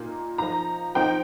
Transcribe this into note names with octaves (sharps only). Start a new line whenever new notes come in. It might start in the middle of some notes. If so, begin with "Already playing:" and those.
Already playing: A#2 A#3 D#4
F3 D#4 A#5
F3 C4 D#4 G5